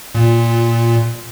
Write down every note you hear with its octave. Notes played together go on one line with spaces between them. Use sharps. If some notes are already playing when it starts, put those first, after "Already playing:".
A#2